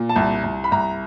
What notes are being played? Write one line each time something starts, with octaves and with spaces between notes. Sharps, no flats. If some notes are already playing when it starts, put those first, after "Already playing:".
Already playing: A#2
A5
C2
C2
B5
C2 A#5